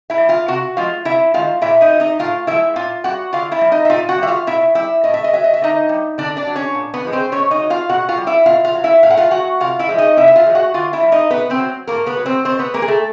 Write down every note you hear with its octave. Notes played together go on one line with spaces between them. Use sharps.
E4 E5
G3
F4 F5
C3 F#4 F#5
F3 G#3 F4 F5
C3 E4 E5
D#3 G#3 F4 F5
A#2 E4 E5
D#4 D#5
F#3
D#4 D#5
A2 F4 F5
F3 G#3 E4 E5
A#2 F4 F5
G3 F#4 F#5
D3 F4 F5
E4 E5
G3
D#4 D#5
E5
A#2 F4 F5
F#4 F#5
G3 E5
F4 F5
B2 E4 E5
G3 E4 E5
A2 D#5
E5
D#5
F#3 E5
D#5
E5
D3 D#4 D#5
G3
D3 D4 D5
D4 D5
F#3
C#4 C#5
A#2
B3 B4
F3 G#3
C4 C5
B2 C#4 C#5
D#4 D#5
F#3
F4 F5
B2 F#4 F#5
F4 F5
G3
E4 E5
B2 F4 F5
F4 F5
F#3
E4 E5
A2 F5
F#5
F4 F5
F#3 F#4 F#5
C3 F4 F5
E4 E5
F3 G#3
D#4 D#5
C3 E4 E5
E5
F4 F5
F3 G#3
F#4 F#5
D3 F4 F5
E4 E5
G3
D#4 D#5
B2 B3 B4
C4 C5
F#3
A2 A#3 A#4
B3 B4
F#3
C4 C5
B2 C4 C5
B3 B4
G#3 A#3 A#4
G#4
A3 A4